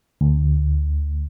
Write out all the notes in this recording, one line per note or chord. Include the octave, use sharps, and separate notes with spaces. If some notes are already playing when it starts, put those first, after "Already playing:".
D2